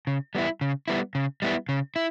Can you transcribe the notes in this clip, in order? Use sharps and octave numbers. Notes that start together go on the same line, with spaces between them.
C#3
G3 B3 E4
C#3
G3 B3 E4
C#3
G3 B3 E4
C#3
E4